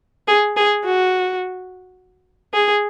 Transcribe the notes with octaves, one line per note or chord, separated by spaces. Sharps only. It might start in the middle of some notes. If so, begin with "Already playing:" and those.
G#4
G#4
F#4
G#4